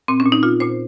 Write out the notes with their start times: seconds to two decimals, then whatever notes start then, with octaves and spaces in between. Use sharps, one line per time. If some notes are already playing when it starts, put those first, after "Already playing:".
0.08 A#2 C4
0.20 C#4
0.26 A#2
0.32 D#4
0.43 A#2 F4
0.60 A#2 C5